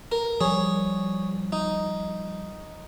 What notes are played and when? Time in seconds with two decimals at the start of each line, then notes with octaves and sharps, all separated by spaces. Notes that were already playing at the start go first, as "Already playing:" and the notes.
0.12 A#4
0.41 F3 G3 G#4 C#5
1.52 D#4